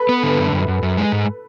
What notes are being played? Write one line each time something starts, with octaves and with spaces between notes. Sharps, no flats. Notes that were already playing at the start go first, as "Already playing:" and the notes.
Already playing: A4 B4
B3
D3
F#2
F#2
F#2
F#2
G#3
G#2